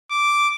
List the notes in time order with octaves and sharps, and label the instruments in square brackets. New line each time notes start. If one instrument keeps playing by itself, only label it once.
[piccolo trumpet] D6